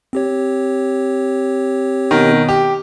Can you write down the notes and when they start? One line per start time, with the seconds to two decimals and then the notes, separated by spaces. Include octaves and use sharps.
0.13 C4 G4 C#5
2.11 B2 D#3
2.48 G4